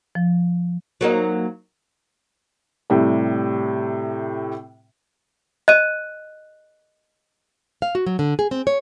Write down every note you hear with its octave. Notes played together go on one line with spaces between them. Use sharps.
F3
F#3 A#3 D#4
A2 C3 G3
D#5 F#6 D#7
F5
F#4
F#3
D3
G#4
C4
C#5